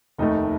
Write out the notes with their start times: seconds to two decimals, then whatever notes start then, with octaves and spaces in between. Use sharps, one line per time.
0.18 F1 D#2 D#3 A3 D#4